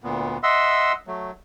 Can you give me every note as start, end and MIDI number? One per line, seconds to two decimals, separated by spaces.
0.04 0.37 38
0.04 0.37 46
0.04 0.37 59
0.43 0.92 75
0.43 0.92 76
0.43 0.92 78
0.43 0.92 84
0.43 0.92 88
1.07 1.31 54
1.07 1.31 57